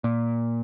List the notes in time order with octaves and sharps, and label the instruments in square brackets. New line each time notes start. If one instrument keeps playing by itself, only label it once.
[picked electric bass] A#2